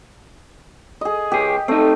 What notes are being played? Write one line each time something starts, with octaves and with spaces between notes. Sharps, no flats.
G#4 D#5
C#2 G4 G#4
A3 C4 D#4